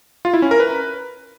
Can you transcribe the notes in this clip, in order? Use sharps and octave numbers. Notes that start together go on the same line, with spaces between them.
F4
E4
C#4
A#4
B4